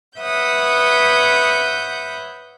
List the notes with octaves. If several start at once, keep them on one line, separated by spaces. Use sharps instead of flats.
B4 C#5 E5 F#5 D#6 G6